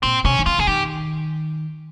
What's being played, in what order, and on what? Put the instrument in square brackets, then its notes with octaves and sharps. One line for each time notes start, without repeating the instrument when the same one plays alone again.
[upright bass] A#2 [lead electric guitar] C4
[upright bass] C3 [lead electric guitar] C#4
[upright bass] D#3
[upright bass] C#3 [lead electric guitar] F4
[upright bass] C#3 [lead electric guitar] G#4
[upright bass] D#3 [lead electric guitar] G4